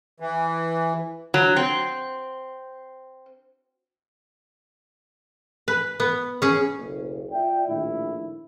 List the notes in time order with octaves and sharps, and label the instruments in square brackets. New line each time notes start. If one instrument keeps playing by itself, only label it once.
[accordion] E3
[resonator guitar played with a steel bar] F#3
C4
[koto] B4
B3
C#4 G#4
[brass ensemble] F#1 B1
F4 D5 E5 G5
A#1 A2 D#3 A3 E4